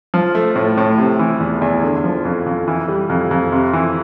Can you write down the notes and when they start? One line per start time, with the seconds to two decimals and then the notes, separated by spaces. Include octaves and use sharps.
0.14 F3
0.35 A3
0.56 A2
0.77 A2
0.98 C3
1.19 E3
1.40 E2
1.61 E2
1.83 D3
2.04 F3
2.25 F2
2.46 F2
2.68 E3
2.88 G3
3.09 F2
3.31 F2
3.52 C3
3.73 E3